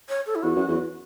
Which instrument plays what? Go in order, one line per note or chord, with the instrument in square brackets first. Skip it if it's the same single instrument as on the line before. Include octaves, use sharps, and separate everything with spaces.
[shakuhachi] C#5
A4
E4
[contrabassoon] E2 [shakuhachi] F#4
[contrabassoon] F#2
E2